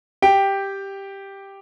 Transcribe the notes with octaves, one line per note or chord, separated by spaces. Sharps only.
G4 G5